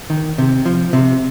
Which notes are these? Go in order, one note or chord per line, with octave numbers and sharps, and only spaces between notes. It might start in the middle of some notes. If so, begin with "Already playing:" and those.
D#3
C3
F3
C3